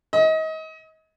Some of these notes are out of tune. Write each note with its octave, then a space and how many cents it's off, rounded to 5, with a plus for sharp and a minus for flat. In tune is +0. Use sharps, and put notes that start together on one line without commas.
D#5 +30